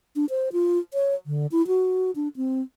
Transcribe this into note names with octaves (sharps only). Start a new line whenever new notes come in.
D4
C5
F4
C#5
D3
E4
F#4
D4
C4